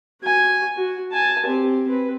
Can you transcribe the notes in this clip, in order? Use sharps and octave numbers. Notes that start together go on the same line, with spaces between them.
F#4 G#5
F#4
G#5 A5
C4 G4
C4 B4